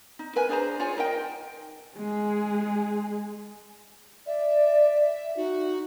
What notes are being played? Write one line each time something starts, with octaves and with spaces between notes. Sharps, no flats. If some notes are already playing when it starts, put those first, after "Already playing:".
D#4
A#4 B4 G#5
D4 G#4 C5 A#5
F4 G#4 C#5 G#5
D#4 A#4 D#5 G5
G#3 G#4
D5 E5
D#4 F#4